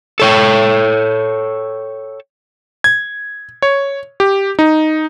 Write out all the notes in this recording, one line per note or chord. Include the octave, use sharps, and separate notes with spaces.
A4 C#5 G5
G#6
C#5
G4
D#4